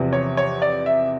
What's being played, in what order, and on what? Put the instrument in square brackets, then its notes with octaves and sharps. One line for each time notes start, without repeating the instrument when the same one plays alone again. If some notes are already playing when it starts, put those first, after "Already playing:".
Already playing: [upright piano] E2 C3 F3
[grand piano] C#5
C#5
D5
E5